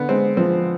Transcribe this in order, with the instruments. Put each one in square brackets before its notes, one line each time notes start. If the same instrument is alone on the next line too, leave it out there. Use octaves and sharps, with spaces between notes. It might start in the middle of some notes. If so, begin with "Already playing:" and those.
Already playing: [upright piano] D3 [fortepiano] B3
[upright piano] G#3 [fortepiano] C4
[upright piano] F3 [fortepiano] C4